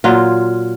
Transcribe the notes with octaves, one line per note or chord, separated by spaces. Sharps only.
A#2 F#3 F4